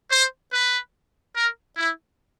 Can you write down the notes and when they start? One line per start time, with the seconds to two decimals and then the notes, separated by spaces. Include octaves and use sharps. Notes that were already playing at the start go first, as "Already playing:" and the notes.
0.11 C5
0.53 B4
1.35 A#4
1.77 E4